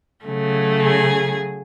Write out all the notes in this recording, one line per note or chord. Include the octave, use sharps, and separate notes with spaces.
C#3 F#3 A3
G#4